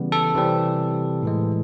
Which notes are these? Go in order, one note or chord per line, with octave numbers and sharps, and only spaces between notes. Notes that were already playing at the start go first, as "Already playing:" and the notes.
Already playing: C#3 E3 G3 B3
A4
C3 E3 G3 C4
A2 E3 G#3